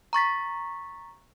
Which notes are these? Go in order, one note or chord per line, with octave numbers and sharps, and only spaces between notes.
A#5 C#6 A6 B6